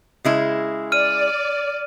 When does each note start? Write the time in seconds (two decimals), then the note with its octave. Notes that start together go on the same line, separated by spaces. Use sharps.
0.25 C#3 G#3 E4
0.92 D5 F6 D#7